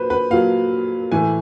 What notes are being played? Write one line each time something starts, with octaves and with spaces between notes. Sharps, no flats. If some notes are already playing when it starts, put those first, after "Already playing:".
Already playing: A#2 F#3 B4 C5
B4
A#2 F#3 F5
A2 E3 G#5